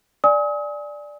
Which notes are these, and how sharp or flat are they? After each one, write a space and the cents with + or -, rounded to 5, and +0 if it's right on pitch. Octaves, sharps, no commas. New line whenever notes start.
D5 +0 G#5 -5 D#6 +40